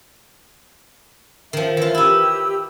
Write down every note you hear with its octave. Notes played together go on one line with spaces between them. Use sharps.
D#3 F3 E5
E3 F4
D#4 E4 G4 E6